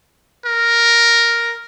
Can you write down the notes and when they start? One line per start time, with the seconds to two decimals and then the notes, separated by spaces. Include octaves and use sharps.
0.45 A#4